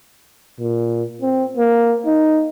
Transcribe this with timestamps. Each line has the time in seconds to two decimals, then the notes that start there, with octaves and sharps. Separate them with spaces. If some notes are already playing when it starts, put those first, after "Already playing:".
0.59 A#2
1.22 C4
1.57 A#3
2.07 D#4